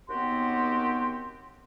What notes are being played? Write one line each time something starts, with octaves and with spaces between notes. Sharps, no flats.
D#2 B3 C4 F#4 G4 C6